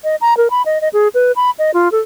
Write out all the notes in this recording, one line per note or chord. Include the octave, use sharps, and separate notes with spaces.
D#5
A#5
A#4
B5
D#5
D#5
G#4
B4
B5
D#5
F4
A4